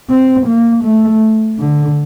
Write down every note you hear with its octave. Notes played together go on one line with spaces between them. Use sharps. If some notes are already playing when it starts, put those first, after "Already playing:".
C4
A#3
A3
D3